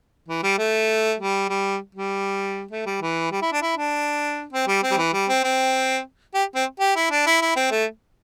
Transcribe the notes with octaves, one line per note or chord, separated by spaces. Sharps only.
E3
G3
A3
G3
G3
G3
A3
G3
E3
G3
E4
D4
E4
D4
C4
G3
C4
G3
E3
G3
C4
C4
G4
C4
G4
E4
D4
E4
E4
C4
A3